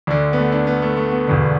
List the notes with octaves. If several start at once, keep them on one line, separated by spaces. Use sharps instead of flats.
D2 D3 D4
B3
A3
D4
B3
A3
A3
B3
E1 D2 D3